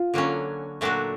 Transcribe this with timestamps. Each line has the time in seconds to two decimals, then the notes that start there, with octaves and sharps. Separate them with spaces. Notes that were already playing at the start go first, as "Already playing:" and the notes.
Already playing: F4
0.14 D3 F#3 A#3 C#4
0.81 A#2 F#3 A3 D4 F#4